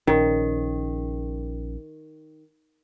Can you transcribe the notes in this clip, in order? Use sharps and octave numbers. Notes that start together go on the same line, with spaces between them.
A#1 D#3 C#4